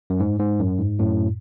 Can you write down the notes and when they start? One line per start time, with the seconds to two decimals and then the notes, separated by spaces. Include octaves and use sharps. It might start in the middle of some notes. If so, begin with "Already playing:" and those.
0.10 F#2
0.20 G#2
0.39 G#2
0.59 F#2
0.79 G#2
0.99 F#2 A2